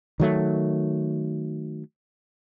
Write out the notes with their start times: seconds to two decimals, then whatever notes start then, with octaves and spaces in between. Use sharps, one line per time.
0.20 D#3 F#3 A3